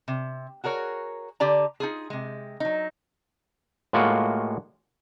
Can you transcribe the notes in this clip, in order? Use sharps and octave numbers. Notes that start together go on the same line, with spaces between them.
C3
F#4 G#4 A#4 C#5
D3 G4 D5 A#5
D#4 F4 G#4
C3 G#3
F#3 D#4
A2 G#3 A#3 F4 F#4